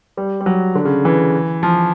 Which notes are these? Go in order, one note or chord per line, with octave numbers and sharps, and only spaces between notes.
G3
G3
F#3
D3
C#3
E3
F3